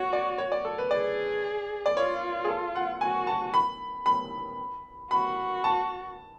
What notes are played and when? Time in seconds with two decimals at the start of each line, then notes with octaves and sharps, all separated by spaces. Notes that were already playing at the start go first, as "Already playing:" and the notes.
Already playing: F#4 C#5
0.13 D5
0.38 C#5
0.52 D5
0.65 A4
0.78 B4
0.91 G#4 D5
1.86 D5
1.96 F4 C#5
2.45 G#4
2.48 A4
2.76 F#5
3.01 F#4 G#5
3.27 A5
3.54 B5
4.06 B5
5.11 F#4 B5
5.64 A5